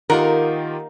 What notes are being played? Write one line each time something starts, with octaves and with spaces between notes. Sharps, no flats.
D#3 A#3 D#4 F4 G4 A#4 F#5